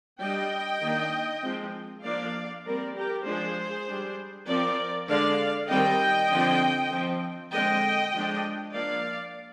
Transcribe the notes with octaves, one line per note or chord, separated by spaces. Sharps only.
G3 D4 D#5 G5
D#3 A#3 D4
F3 G#3 C4
F3 A#3 D4 D5 F5
G3 C4 A#4 D5
G4 A#4
F3 G#3 D4 G#4 C5
G3 D4
F3 C4 A#4 D5
D3 G#3 D4 D5 F5
D#3 G3 C4 D#5 G5
D3 F3 C4
F3 C4
D3 G#3 C4 D#5 G5
F3 G#3 D4
F3 A#3 D4 D5 F5